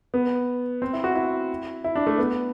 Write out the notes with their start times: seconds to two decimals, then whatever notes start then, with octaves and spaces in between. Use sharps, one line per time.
0.14 B3
0.82 C4
0.93 E4
1.04 F#4
1.15 E4
1.84 E4
1.96 D4
2.07 A3
2.18 B3